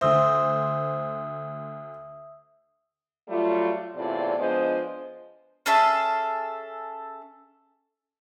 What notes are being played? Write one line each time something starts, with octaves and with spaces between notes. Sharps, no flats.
D2 C5 E5 D#6 E6
F#3 G3 A3 F4
E2 A2 C3 F4 D5
F3 G#3 B3 D4 C5 D#5
C#4 G#4 A4 E5